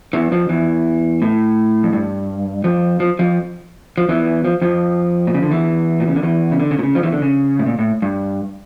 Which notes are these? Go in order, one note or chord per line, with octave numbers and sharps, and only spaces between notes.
E2 E3
F2 F3
E2 E3
A2
F2
G2
F2 F3
F3
F2 F3
F3
E2 E3
F3
F2 F3
A#2
C#3
D3
E2 E3
A#2
C#3
D3
E2 E3
C#3
D3
C#3
A#2
C#3
F2 F3
E2 E3
D3
C#3
A2
A#2
A2
G2